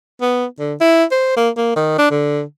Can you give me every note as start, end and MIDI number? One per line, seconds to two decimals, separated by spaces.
0.21 0.45 59
0.59 0.74 50
0.81 1.04 64
1.11 1.33 72
1.37 1.50 58
1.57 1.72 58
1.76 1.96 51
1.98 2.09 62
2.11 2.42 50